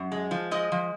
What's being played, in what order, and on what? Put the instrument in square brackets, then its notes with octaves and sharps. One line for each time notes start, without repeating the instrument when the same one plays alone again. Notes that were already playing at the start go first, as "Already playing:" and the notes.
Already playing: [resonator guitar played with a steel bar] F#2
G#3
F3
G#3 D#5
F3